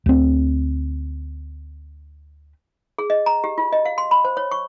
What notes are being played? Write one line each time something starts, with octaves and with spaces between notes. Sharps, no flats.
D2 C4
G#4
D#5
A#5
G4
F4
D#5
F5
C6
B5
C5
C#5
C#6